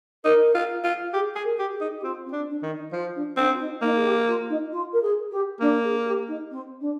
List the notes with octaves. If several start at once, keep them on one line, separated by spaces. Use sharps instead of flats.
D#4 A#4
F4
F4
G4 G#4
G#4
A#4
G4
G4
G#4
D#4
G4
C4 F4
C4
D4
D4
D#3
D#4
F3 F4
D4
C4 D4
F4
D#4
A#3 D#4
G#4
G4
F4
D#4
F4
A#4
G#4
G4
A#3 D4
G#4
G4
D#4
C4
D4